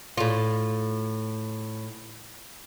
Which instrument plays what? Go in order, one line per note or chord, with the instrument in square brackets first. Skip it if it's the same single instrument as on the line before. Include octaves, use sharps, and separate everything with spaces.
[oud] A2 F4